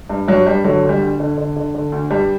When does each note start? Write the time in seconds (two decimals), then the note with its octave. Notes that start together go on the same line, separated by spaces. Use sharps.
0.10 G2
0.28 G2 F#3
0.46 G2 G3
0.64 D3 F#3
0.83 D2
0.89 G3
1.01 D2
1.20 D3
1.38 D3
1.56 D3
1.75 D3
1.92 D2
2.11 G2 G3